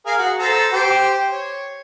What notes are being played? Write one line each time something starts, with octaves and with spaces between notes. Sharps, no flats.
G#4 A#4 F5
F#4
A4 C5 A#5
G4 C5 G5
C#5